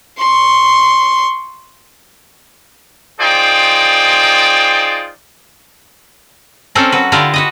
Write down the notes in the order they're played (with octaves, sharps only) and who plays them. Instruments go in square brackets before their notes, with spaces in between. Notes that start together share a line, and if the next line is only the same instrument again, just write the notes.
[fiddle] C6 C#6
[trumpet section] D#4 F4 G#4 C5 D5 G5
[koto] C4 C#4 A4 A#4 C5 D5
F#3 F#4 B4
D3 E4 F4 G4 A#4 D5
F#4 B4 D#5